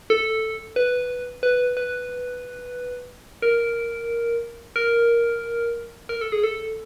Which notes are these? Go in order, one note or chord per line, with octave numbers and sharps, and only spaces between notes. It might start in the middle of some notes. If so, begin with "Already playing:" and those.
A4
B4
B4
B4
A#4
A#4
A#4
A4
G#4
A4